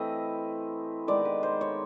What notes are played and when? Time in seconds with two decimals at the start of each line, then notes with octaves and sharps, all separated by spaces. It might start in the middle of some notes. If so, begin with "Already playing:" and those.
Already playing: E3 A3 C4 E4 D#5
1.08 D#3 G#3 B3 D#4 D5
1.25 B4
1.43 C5
1.61 C#5